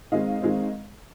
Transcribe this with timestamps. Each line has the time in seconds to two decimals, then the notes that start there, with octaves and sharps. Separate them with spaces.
0.12 D#3 G#3 C4 D#5 F5
0.42 D#3 G#3 C4